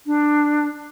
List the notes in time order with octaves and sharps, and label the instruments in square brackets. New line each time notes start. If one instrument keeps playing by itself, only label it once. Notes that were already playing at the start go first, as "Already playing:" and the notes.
[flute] D4